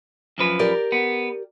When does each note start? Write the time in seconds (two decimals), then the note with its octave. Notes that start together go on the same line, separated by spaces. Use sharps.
0.38 F#2 F3 B4
0.59 G4 A#4 D5
0.92 B3